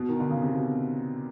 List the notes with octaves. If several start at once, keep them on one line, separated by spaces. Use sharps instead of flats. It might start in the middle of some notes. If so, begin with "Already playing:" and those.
Already playing: B2
D#3
D3
C#3
C3
B2